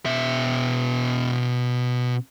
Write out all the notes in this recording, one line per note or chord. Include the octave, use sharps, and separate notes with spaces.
B2 E5